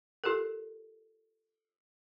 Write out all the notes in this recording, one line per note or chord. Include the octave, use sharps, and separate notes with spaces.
F4 G4 A4 A#4